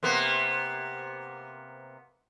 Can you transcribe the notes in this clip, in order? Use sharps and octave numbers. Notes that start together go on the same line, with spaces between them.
C3 A#3 B3